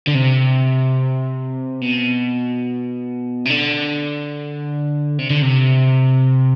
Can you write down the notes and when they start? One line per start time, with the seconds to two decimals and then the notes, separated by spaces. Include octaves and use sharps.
0.07 D3
0.14 C3
1.82 B2
3.45 C3
3.50 D3
5.19 C3
5.30 D3
5.42 C3